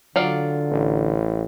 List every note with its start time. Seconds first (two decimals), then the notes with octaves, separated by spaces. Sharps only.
0.16 D3 F#3 F4 D5
0.71 A1